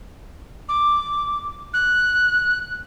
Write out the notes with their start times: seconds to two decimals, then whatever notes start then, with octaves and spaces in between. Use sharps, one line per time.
0.69 D6
1.74 F#6